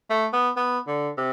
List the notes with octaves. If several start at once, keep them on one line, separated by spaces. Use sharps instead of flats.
A3
B3
B3
D3
C3